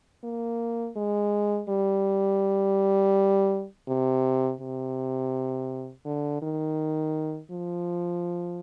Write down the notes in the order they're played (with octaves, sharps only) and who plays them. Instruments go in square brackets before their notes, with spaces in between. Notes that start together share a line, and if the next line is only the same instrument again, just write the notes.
[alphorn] A#3
G#3
G3
C3
C3
D3
D#3
F3